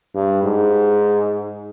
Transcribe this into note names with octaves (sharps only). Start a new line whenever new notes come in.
G2
G#2